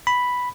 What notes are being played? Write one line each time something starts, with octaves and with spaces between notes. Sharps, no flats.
B5